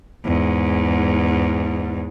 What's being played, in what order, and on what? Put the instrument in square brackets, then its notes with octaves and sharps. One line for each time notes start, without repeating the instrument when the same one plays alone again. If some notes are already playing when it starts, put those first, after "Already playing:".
[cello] E2 G#2